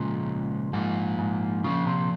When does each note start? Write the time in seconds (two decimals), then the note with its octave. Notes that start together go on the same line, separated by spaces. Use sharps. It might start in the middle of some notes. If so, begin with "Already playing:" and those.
Already playing: A#2 C#3 F3 G#3 C#4
0.73 G#2 F3 A#3 F4
1.19 G#2
1.64 C#3 F3 A#3 F4
1.86 C3